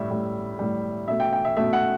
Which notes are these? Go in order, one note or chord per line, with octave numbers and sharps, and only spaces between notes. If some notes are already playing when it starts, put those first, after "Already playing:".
Already playing: A2 G3 E5
A2 G3
A2 G3
B2 A3 E5
G5
G5
E5
B2 A3 E5
F#5